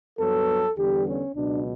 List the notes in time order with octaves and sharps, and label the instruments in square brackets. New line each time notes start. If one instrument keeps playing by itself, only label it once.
[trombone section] G2 F#3 B3 A4
E2 D3 G3 B3 G4
C#4
C#2 B2 F#3 D4